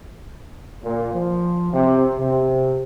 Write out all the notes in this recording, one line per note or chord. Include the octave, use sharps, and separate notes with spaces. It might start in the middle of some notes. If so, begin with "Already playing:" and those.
A#2
F3
C3
C3